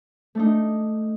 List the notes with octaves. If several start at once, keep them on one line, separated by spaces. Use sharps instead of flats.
A3 D4 D#4